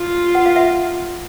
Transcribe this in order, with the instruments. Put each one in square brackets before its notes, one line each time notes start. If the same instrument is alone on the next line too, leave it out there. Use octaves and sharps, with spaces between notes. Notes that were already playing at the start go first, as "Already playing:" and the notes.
Already playing: [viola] F4
[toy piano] F#5
F5
E5 F#5